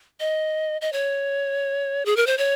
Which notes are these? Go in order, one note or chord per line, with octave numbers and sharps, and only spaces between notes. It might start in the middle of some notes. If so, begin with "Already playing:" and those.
D#5
D#5
C#5
G#4
A#4
C5
C#5